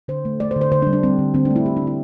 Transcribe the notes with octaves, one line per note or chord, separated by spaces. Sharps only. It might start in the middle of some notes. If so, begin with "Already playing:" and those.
D3 C5
A3
A3 D5
C5
D3
C5
D3 C5
D4
G3
D4
G3 C4
D3
D3 C4
D4
A3
E4
A3 G4
D4
D3 E4